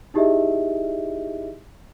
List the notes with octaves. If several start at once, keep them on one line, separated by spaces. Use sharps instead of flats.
D#4 E4 G4 G#4 D#5 E5